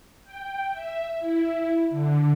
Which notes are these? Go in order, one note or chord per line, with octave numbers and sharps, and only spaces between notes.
G5
E5
E4
D3